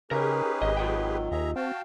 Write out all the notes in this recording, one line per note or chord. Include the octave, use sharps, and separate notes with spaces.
C#3 C#4 D#4 G4 G#4 A#4 B4
G#1 D#5
D#3 F#3 F4 D#5 G5
D#2 G#4 E5 A#5
C4 F#4 F5 G5 A5